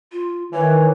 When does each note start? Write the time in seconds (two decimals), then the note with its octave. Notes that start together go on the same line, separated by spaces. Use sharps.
0.12 F4
0.52 D#3 E3 C#5